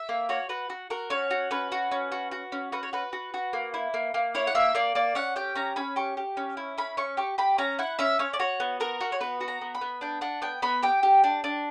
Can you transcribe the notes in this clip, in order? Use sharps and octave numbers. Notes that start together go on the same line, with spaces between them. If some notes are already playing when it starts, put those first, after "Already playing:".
Already playing: E5
A#3
F#4 C#5
F#4 B4
F#4
F#4 A#4
C#4 C#5
F#4
C#4 B4
F#4
C#4
F#4
F#4
C#4
F#4 B4
C#5
F#4 B4
F#4
F#4
A#3
E4
A#3
A#3
E4 C#5
F#5
A#3 E5
A#3 D5
A#3 D5
C#4 F#5
G4 G5
C#4 A#5
C#4 B5
G4 C#6
G4
C#4
E4
C#4 B5
C#4 C#6
G4 C#6
G4 B5
C#4 A#5
E4 F#5
C#4 E5
C#4 C#5
D5
F#4 C#5
B3
F#4 A#4
F#4
C#5
B3 B4
F#4
A#5
B3
B5
B3
D4 G5
D4 F#5
B3 G5
B3 B5
G4 G5
G4
D4
D4